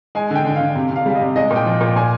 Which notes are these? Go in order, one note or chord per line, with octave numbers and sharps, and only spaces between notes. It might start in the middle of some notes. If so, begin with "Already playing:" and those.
G#3 G#5
D3 G5
D3
D3 F5
C3
C3
F5
G3 F5
D#5
C3
G#3 D#5
A#2
G5
F3
A#2
A#2 G#5